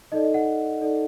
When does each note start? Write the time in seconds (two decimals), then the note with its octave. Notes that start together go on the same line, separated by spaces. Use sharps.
0.12 D#4 A4 D5 D#5
0.34 F#5
0.81 D#4 A4 D5